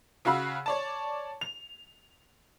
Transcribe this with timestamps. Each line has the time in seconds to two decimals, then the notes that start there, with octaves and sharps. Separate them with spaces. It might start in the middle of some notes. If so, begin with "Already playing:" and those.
0.25 C#3 F#4 F5 B5 E6
0.66 C#5 D5 A5
1.41 F7